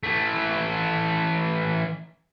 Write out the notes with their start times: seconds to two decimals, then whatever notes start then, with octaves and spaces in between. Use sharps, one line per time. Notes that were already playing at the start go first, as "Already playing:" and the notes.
0.03 E3 A3